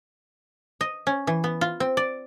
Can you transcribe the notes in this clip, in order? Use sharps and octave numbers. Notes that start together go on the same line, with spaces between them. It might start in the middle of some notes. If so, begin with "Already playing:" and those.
D#5
C#4
E3
B3
F4
C4
D5